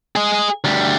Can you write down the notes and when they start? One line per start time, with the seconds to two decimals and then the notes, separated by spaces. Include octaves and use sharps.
0.16 G#4 D#5
0.64 D2 G3